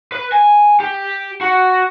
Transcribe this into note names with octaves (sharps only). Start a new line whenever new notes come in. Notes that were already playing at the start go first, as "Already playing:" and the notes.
B4
G#5
G4
F#4